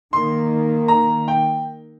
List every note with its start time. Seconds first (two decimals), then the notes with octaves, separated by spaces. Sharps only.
0.13 D#3 A#3 C6
0.88 A#5
1.28 G5